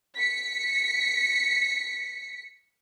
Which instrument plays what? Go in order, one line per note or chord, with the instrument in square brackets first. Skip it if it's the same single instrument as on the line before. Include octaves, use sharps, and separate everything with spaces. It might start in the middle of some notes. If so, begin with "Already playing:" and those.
[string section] B6 C#7